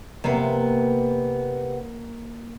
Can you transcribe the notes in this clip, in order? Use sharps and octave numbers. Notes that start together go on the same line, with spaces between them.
C3 A#3 B3